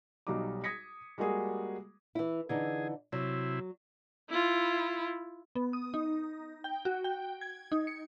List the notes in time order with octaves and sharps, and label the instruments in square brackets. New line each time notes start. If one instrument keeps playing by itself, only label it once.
[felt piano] B1 F#3 G3 D#4 D6
D#6 G#6 A#6 B6 C#7
G3 G#3 A#3 F#4 G#4
[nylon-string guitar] E3 E4
[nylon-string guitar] D3 E3 D#4 [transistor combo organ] G#4
[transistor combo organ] C3 E4 [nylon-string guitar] F#3
[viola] E4 F4
[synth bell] B3
D#6
D#4
G5
F#4
G5
G#6
D#4
C#7